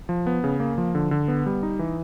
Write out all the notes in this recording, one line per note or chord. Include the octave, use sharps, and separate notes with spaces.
F3
B3
C#3
A#3
F3
D3
D3
B3
G3
D#4
E3